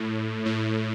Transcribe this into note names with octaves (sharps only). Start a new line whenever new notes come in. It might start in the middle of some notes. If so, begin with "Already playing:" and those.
Already playing: A2
A2